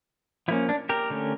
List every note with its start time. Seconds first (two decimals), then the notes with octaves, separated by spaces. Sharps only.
0.48 F3 A#3 C#4 E4
0.69 D4
0.89 G4 A#4
1.10 D3 A3 C#4